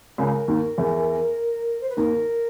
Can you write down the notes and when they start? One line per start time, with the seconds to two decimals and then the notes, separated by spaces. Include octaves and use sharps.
0.18 C#2 C#3 A#4
0.48 D#2 D#3
0.78 E2 E3
1.81 C5
1.90 B4
1.97 D#2 D#3 A#4